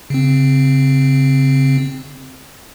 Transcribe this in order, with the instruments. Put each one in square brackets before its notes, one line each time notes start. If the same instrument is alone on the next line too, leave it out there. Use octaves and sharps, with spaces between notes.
[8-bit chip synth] C#3 C4